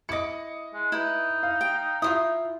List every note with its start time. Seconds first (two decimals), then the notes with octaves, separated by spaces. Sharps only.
0.09 E4 D#5 D6 C#7
0.74 G#3
0.92 D#4 E4 B4
1.43 F5
1.61 G5
2.02 E4 F4 C5 D#6